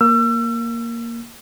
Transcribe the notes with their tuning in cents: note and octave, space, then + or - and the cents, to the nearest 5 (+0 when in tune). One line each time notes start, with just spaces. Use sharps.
A#3 +0 E6 +35